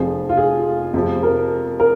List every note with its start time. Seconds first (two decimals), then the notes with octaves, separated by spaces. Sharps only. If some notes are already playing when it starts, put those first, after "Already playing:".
Already playing: F1 F2 F3 G#4
0.29 F4
0.37 G#4
0.94 F2 C3 F3 G#3
1.23 A#4
1.80 A#4